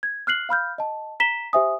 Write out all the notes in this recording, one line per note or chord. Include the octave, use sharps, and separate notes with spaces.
G#6
F6 F#6 C7 F#7
F5 B5 F6 G6
D#5 A5
A#5 B6 E7 G7
G4 C5 E5 G#5 D#6